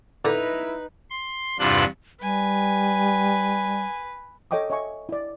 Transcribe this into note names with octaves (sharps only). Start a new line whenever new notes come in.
D3 D#4 E4 B4 A#5
C6
E2 G2 C3 D4 F4 F#6
G3 B4 G#5
A4 C#5 D#5 G5 D6 D#6
C#5 D#5 E5 G#5 C#6
E4 D5